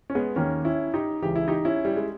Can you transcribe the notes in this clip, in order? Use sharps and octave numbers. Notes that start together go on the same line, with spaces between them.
C#4
G#3 B3
D#2 D#3 A#3 C#4
C#4 E4
D#4 G4
C#2 C#3 E3 G4
E4
D#4 G4
C#4 E4
G3
G#3